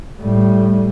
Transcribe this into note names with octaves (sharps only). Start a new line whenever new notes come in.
A2 G3